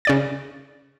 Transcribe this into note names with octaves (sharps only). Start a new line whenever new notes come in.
C#3 D5 A6